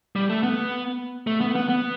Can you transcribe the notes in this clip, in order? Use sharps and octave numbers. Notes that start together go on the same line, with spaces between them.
G3
A3
B3
A3
B3
B3
B3